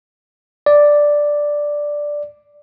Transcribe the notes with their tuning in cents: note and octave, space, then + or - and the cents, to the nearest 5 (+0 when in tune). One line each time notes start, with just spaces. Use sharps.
D5 +0